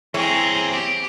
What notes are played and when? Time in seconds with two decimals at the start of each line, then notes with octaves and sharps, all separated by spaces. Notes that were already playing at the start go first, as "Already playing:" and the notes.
0.14 E3 G#3 C4 E4 G#4 C#5 A#5
0.72 G4